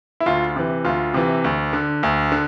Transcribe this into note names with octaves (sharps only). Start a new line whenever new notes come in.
E4
D2 F4
C3 E3
D2 F4
C3 E3
D2
D3
D2
D3